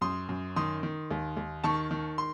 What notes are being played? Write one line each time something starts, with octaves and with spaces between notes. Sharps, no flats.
F#2 C6 D#6
F#2
D#3 C6 D#6
D#3
D#2
D#2
D#3 A5 C#6
D#3
C6